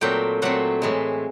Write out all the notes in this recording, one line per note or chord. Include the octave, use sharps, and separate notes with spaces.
A#2 F#3 A3 C4 G5
A#2 F#3 A3 C4 F#5
A2 E3 G#3